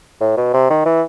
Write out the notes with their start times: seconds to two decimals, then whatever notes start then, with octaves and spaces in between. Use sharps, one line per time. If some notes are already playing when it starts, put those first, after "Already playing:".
0.21 A2
0.37 B2
0.54 C3
0.70 D#3
0.85 E3